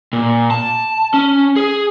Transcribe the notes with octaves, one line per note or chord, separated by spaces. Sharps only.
A#2
A5
C#4
G#4